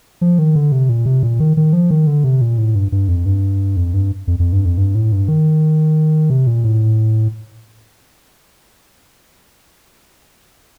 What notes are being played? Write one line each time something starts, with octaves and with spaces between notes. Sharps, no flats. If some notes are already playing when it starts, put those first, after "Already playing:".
F3
D#3
D3
C3
A#2
C3
A#2
D#3
D#3
F3
D#3
D3
C3
A#2
A2
G2
G2
F2
G2
F2
G2
F2
F2
G2
F2
G2
A2
G2
D#3
C3
A#2
A2